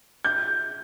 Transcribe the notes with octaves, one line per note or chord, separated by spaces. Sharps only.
G6